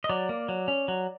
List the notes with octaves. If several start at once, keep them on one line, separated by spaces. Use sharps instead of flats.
D#5
F#3 D5
A#3
F#3
C#4
F#3